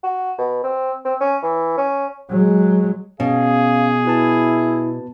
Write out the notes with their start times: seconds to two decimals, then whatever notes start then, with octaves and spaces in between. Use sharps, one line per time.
0.04 F#4
0.39 B2
0.64 C4
1.05 C4
1.21 C#4
1.43 E3
1.77 C#4
2.30 F#3 G#3
3.20 B2 C#4 G#4 F5
4.05 E4 F#4 B4 A5